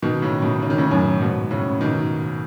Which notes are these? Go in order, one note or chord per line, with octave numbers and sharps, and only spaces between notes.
B2 D#3
A2 C#3
B2 D#3
C#3
D#3
A2 C#3
F#2 A2
G#2 B2
A2 C#3
B2 D#3